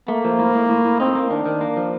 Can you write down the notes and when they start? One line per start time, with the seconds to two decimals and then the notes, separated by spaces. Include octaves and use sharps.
0.08 A3 A#3
0.25 F3
0.39 A2
0.55 A2
0.69 A2
0.85 A2
1.00 C4 D#4
1.15 A#3
1.30 D#3 D4
1.46 D#3
1.61 A#3
1.76 F3